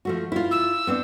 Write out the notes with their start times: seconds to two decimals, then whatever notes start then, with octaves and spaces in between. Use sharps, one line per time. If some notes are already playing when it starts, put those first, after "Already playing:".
0.05 F3 A3 F#4
0.32 E4 F4
0.51 E6
0.87 B3 C4 D4